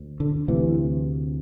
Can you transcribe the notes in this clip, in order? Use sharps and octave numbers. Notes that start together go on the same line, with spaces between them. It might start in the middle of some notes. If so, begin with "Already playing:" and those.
Already playing: D2
D3
D2 C3 E3